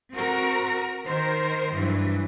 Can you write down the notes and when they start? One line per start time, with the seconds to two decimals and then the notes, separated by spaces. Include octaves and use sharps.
0.12 C4 F#4 A#4
1.05 D#3 A#4 C5
1.73 G2 E3 F#3